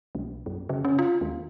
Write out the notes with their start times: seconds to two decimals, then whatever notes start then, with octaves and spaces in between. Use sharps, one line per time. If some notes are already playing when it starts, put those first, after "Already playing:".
0.15 B1
0.46 F#2
0.69 C#3
0.85 C#4
0.99 F4
1.21 D#2